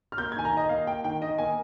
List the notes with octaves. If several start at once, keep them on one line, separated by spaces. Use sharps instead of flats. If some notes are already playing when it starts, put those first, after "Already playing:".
F6
A#3 G6
G#6
D#3 G#5
A#5
D#3 D#5
A#3 F5
A#3 G5
D#3 G5
D#3 D#5
A#3 G#5